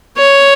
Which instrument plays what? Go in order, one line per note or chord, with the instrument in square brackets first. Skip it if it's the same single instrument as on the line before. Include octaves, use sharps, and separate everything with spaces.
[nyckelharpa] C#5